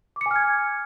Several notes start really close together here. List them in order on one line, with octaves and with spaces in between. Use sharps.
D6 C#7 G#5 F6 G#6